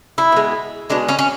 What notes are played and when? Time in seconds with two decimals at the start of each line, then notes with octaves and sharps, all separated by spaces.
0.18 E4
0.32 B2 G#3
0.90 B2 G#3 D4
1.09 C#4
1.19 C#4